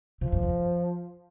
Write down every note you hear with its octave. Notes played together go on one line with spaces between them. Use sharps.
C3 F3
F#2
F2